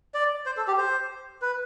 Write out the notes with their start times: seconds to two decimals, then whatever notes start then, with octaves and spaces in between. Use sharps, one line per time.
0.14 D5
0.46 C5
0.57 A4
0.68 G4
0.78 C5
1.42 B4